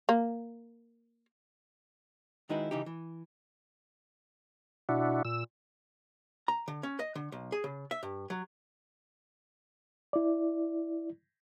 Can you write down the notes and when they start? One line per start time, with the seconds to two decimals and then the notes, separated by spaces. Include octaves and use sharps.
0.09 A#3
2.49 D#3 G#3 D#4 E4 F#4 B4
2.71 C#3 E3 D#4 G4
2.86 E3
4.89 B2 D4 E4 F#4
5.25 A#2 E6
6.48 A#5
6.68 D3
6.83 C#4
6.99 D#5
7.15 D3
7.32 B1
7.52 G#4
7.64 C#3
7.91 E5
8.03 G2
8.30 F#3
10.13 E4 D5